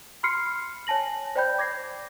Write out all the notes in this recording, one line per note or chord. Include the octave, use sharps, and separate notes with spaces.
B5 C6 F6 C7 C#7
C#5 G#5 A5 A#6 F#7
C5 D5 G5 B5 G6
D6 G#6 A#6 C7